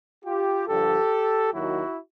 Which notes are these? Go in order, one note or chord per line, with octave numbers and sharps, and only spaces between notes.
F4 G4
G2 D3 F3 G4 A4
D#2 D#3 F#3 E4 F#4